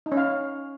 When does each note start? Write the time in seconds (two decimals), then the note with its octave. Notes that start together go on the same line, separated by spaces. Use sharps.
0.06 D#4
0.12 C#4
0.17 F5